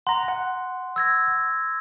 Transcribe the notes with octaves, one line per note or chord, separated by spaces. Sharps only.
F#5 A#5 C6
F#5
E6 G#6 A#6